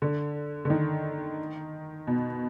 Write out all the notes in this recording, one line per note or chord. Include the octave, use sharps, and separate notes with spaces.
D3
D3
D#3
B2